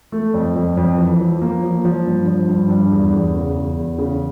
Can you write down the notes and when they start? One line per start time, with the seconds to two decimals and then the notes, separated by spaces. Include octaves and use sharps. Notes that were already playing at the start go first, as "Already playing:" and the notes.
0.12 A3
0.34 F2
0.56 F2
0.77 F2
0.98 E3
1.21 F3
1.42 A#3
1.63 F3
1.85 F3
2.06 G2
2.28 F3
2.49 G2
2.70 G2
2.92 E2
3.13 E2
3.34 C#3
3.56 E2
3.77 E2
3.98 C#3